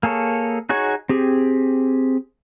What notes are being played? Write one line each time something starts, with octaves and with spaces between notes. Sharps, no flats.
A#3 G#4 A4 C#5
D#4 F#4 G#4 C#5 C#6
C4 G4 G#4